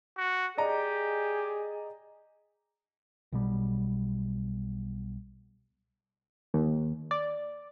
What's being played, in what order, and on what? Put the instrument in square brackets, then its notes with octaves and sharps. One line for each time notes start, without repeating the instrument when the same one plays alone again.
[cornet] F#4
[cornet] G4 [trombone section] G#4 [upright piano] D5 D#5 A#5
[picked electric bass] B1 B2 G3
[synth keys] D#2
D5